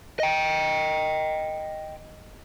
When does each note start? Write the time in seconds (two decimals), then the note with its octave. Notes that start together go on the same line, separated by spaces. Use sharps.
0.20 D#5 G5